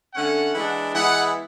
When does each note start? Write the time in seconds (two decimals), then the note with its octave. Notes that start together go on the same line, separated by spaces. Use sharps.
0.15 D3 A3 C#4 F#5
0.55 E3 G#3 D4
0.95 E3 G#3 B3 F#5